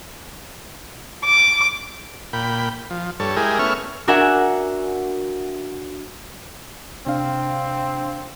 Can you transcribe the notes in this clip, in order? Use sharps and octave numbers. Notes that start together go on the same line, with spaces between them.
D6
A#2 G5 B5
F3
G2 A4 C#5
G#3 E4 G4 G#4 A#4
A3 B3 C#4 E5 C#6 F6
D4 F#4 A#4 E5 F#5 G#5
C3 C4 D4 F5